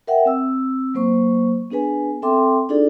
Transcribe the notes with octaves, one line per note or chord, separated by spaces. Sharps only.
A#4 E5 F#5 G5
C4 E6
F#3 A#3 C5 C#6
B3 D4 G#4 B4 G#5
C4 A4 E5 G5 C6 D6
D4 D#4 F4 G#4 A4 D5